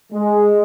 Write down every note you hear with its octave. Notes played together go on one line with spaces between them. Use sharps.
G#3